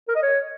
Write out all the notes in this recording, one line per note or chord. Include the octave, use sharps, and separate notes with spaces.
A#4
D#5
C#5